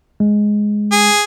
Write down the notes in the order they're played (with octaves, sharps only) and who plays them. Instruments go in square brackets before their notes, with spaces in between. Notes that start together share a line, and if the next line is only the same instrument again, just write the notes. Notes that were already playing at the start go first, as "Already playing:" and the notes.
[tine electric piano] G#3
[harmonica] G#4